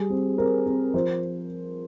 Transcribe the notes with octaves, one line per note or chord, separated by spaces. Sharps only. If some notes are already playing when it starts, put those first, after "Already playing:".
Already playing: G3 G#4
C4
C4 A#4
C4
F3 C5